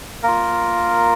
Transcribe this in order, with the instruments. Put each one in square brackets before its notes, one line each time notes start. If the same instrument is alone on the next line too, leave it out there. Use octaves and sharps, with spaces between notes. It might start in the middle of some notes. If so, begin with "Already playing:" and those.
[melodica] A#3 F4 A#4